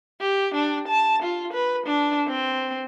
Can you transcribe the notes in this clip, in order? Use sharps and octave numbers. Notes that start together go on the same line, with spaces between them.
G4
D4
A5
F4
B4
D4
C4